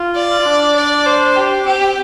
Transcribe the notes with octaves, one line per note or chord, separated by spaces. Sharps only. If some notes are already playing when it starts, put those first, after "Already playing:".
Already playing: F4
D5
F4
D4
D5
C5
G4
C4 G4
C4